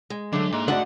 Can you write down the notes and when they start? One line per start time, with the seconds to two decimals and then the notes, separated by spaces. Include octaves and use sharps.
0.10 G#3
0.33 D3 F#3 A3
0.52 G#2 A#3 C6
0.68 D3 A3 D4 F#4 D#5 F#5